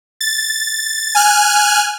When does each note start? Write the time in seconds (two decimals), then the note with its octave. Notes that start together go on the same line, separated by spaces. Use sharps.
0.21 A6
1.15 G#5 F6 F#6